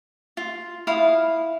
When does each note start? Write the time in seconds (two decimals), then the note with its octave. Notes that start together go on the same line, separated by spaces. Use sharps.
0.37 F4
0.87 E4 F5 D#6